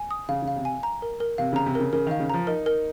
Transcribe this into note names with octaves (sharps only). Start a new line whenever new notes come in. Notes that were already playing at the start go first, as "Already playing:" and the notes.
Already playing: G#5
D#6
C#3 F5
C#3
F5
C3
G#5
A#5
A#4
A#4
C3 F5
C#3 A#5
C3
C#3 A#4
C#3 A#4
D#3 F5
C#3
F3 A#5
D#4 A#4
A#4